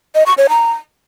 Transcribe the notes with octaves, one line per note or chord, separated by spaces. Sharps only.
D#5
C#6
C#5
A#5